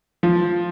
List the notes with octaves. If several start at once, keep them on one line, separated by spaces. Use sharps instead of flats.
F3